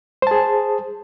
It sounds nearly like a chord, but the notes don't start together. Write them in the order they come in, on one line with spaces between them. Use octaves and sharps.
C5 A5 G#4